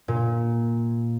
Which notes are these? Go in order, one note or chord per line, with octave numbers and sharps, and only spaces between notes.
A#2